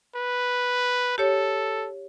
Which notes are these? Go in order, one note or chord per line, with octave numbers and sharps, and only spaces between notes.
B4
G4 A4 C#5